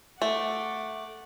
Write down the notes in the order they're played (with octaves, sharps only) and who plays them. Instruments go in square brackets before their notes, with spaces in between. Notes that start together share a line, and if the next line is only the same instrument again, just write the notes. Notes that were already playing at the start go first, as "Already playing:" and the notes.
[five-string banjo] A3 [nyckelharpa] F#5 D6